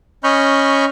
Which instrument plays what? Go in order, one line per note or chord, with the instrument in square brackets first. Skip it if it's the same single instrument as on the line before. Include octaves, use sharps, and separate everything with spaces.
[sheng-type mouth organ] C#4 D#5 B5 C#6 F6 G6